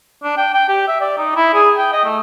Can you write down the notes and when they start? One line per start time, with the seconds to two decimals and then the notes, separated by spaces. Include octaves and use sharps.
0.24 D4
0.37 G5
0.54 G5
0.68 G4
0.88 E5
1.01 D5
1.18 D#4
1.36 E4
1.54 G#4
1.77 G5
1.93 D#5
2.05 A3